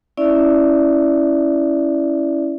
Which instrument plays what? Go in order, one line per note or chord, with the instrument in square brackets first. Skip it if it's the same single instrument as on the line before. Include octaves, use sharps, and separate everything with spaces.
[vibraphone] C#4 E4 D5 E5